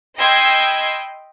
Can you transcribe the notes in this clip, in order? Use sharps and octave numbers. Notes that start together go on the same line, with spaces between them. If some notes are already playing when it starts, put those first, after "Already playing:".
D#5 G5 B5 C6 E6 G#6